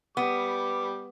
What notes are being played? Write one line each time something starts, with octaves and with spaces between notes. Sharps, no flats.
G3 B3 D6